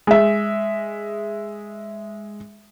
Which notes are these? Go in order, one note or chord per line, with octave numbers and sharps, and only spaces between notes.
G#3 E5